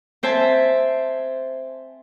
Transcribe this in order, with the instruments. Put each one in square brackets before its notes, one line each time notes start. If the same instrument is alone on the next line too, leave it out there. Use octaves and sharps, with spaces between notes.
[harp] C4 C5 E5 G#5 A5